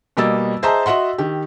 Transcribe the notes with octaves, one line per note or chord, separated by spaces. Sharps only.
B2 G3 A#3 D#5 E6 A6
G#4 C5 D#5 E5 A5 A#5
F#4 D#5 E5 F#5 C6
D#3 G4